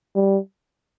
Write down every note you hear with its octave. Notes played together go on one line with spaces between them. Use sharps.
G3